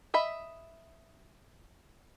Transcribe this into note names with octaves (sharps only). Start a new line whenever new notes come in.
D#5 E5 B5